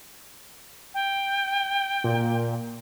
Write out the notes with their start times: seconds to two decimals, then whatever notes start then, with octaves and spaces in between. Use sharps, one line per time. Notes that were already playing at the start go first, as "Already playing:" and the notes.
0.94 G5
2.04 A#2